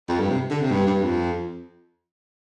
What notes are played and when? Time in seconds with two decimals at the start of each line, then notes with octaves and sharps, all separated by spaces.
0.09 F2
0.19 G2
0.30 C3
0.50 D3
0.61 C3
0.71 G2
0.87 G2
1.02 F2